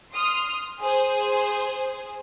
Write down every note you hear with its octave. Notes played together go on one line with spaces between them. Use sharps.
C6 D#6 F6
G#4 C5